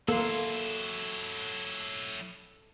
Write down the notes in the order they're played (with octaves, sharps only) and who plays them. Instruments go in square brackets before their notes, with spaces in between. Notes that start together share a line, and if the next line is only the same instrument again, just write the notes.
[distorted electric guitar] F#3 E4 [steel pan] A#3 [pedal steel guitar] A4 C6